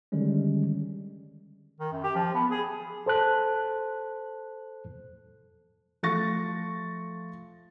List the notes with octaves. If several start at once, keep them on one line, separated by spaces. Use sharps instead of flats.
D3 D#3 G3 G#3 C#4
D#3
F#2
G4
F3
B3
G#4
A4 C5 A5 F#6
F3 A3 C#6 A6 A#6